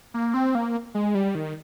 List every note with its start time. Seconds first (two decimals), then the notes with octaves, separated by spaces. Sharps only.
0.14 A#3
0.34 C4
0.55 A#3
0.94 G#3
1.15 G3
1.35 D#3